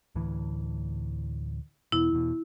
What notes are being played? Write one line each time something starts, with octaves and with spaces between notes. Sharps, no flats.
D2 A2 E3
E2 B2 E4
E2 B2